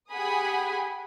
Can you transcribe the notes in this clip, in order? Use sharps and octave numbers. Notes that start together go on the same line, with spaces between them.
G4 G#4 F#5 G#5 B5 D#6